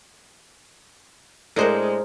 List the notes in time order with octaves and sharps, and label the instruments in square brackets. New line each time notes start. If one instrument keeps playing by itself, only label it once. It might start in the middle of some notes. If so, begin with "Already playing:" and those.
[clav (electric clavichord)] A2 D4 D#5 [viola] G#3 [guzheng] A#4 C5 F#5